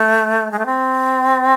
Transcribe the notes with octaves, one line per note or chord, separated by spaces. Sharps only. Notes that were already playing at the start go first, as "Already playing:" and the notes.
Already playing: A3
G#3
A3
C4